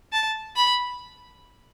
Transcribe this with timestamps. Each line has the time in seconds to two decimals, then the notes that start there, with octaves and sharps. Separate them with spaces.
0.12 A5
0.56 B5